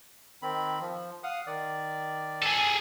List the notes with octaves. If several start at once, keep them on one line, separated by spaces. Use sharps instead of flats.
D#3 C4 B5
F3
F5 F#5 D#6
D#3 D5
G#4 A4